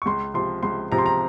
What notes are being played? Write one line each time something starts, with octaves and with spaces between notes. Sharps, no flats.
C#6
C#2 C6
C3 F3 C6
C#2 C6
C3 F3 A#5
C6
A#5